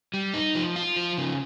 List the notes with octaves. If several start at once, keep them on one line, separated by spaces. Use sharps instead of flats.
G3
D#4
F3
F4
F3
C#3